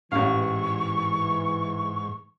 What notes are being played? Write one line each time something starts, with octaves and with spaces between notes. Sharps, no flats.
A1 G#2 E3 F5 C#6